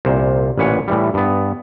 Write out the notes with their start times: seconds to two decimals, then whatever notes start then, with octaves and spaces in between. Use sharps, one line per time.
0.05 C2 A#2 C5
0.58 A1 A#2 B4 C#5 F#5 G#5
0.88 A2 E3 G3
1.14 G2 B3